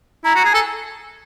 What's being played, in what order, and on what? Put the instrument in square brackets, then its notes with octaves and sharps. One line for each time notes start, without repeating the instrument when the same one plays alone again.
[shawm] E4 [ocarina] A#5
[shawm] F#4
G#4
[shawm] A4 [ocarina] G#5